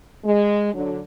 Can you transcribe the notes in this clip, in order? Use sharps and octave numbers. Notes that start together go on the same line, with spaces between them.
G#3
D3 F#3